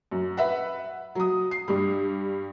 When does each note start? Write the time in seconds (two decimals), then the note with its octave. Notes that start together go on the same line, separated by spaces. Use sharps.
0.11 F#2
0.37 B4 E5 F#5
1.15 F#3 D#6
1.51 C7
1.68 G2 G3